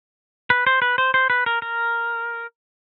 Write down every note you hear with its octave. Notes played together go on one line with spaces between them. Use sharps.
B4
C5
B4
C5
C5
B4
A#4
A#4